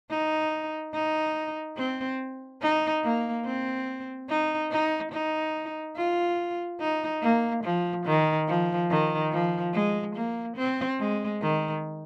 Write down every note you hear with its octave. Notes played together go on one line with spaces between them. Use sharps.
D#4
D#4
C4
D#4
A#3
C4
D#4
D#4
D#4
F4
D#4
A#3
F3
D#3
F3
D#3
F3
G#3
A#3
C4
G#3
D#3